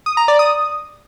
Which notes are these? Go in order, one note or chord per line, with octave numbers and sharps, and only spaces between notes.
D#6
A#5
D5
D#6